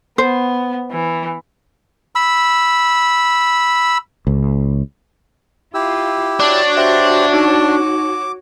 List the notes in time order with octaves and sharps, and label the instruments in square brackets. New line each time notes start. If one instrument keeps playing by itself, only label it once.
[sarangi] B3 [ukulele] C5
[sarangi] E3
[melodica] B5 E6
[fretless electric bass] C#2
[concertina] E4 G4 E6 [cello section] F4
[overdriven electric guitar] D4 [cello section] F#4 C#5
[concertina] G4 C5 D6 [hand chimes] E5
[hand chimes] D#4 [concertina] D6